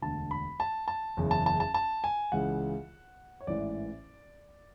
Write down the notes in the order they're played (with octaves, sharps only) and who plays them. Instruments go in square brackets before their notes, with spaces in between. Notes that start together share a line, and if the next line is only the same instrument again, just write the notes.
[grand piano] E1 D2 D3 A5
B5
A5
A5
F#1 E2 C#3
A5
A5
A5
A5
G#5
C#2 C#3 E3 F#5
C#5
A1 G#2 E3 D5